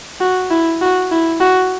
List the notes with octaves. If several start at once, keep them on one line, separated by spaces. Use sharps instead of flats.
F#4
E4
F#4
E4
F#4